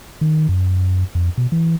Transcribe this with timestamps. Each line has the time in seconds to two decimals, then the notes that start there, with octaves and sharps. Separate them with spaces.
0.21 D#3
0.49 F#2
1.15 F2
1.38 B2
1.52 E3